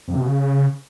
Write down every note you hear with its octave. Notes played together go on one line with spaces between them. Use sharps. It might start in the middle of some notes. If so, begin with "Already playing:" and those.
F2
C3
B2
C#3